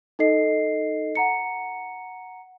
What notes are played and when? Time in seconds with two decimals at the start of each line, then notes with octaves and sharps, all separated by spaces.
0.19 D#4 A4 D#5 C7
1.15 F#5 A#5 C#7